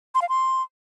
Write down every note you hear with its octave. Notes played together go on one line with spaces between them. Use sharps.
C6
F5
C6